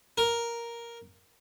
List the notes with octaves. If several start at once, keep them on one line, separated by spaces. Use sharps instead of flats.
A#4